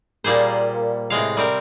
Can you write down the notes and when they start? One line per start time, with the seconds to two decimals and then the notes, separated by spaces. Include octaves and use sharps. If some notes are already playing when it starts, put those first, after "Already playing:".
0.24 A#2 G3 A#3 G#4 C5
1.10 A2 C3 G#3 F5
1.37 G3 C4 A#4